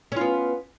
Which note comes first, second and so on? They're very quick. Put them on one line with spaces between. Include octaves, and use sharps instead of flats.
C#4 F4 B3